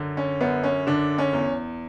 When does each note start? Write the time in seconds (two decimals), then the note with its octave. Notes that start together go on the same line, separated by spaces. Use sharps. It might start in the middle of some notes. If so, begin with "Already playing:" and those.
Already playing: F#2 D3
0.17 C#4
0.41 F#2 B3
0.64 C#4
0.87 D3 D4
1.18 C#4
1.33 E2